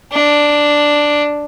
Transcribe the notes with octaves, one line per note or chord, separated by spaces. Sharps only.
D4